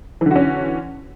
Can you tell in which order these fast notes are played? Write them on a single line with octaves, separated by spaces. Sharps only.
E3 D3 F#4 C#4